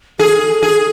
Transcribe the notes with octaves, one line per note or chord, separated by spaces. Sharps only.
G#4 A4
G#4